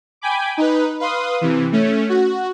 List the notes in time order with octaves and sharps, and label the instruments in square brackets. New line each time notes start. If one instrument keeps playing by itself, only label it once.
[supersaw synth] G5 G#5 B5 D6
D#4 B4
B4 F5 C6 D#6
C3 E3
A3 C#4
F#4